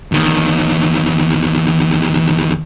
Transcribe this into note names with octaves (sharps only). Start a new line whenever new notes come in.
E2 D#3